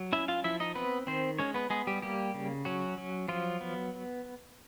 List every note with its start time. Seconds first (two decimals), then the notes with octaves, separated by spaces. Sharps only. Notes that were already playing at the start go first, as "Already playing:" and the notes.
Already playing: F#3
0.13 C#4 E4 E5
0.28 F4 F5
0.44 F3 E4 E5
0.60 D#4 D#5
0.75 B3 C4 B4
1.07 D#3 C4 C5
1.39 G#3 C#4 C#5
1.54 B3 B4
1.70 G#3 B3 G#4
1.87 G3 G4
2.02 G3 A#3 G4
2.34 C#3
2.65 F#3 C#4 F#4
2.98 F#3
3.28 F3 F#3 F4
3.61 B3